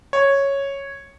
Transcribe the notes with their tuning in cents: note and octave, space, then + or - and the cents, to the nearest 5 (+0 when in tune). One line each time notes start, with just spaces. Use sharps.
C#5 -5